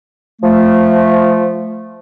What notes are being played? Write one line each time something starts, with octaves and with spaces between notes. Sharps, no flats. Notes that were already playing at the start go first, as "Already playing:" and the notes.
F3 A3